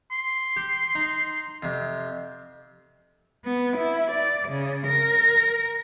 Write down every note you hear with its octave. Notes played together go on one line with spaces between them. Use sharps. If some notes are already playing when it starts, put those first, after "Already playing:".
C6
G4
D#4
F2 C3
B3
E4
D5
C#3
A#4